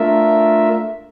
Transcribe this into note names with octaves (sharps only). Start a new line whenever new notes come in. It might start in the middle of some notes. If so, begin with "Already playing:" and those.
Already playing: A3 D4 F4 A#4 E5